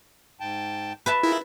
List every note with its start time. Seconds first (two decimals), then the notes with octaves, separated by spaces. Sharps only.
0.40 G#2 G5 A5
1.06 B4 E5 A5
1.23 E4 F4 G#4 A#4